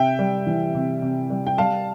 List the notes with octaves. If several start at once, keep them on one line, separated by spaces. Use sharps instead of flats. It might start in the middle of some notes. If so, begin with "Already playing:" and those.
Already playing: C3 E5 G5
G3
E3
C3
C3
G3
G5
G3 F5 A5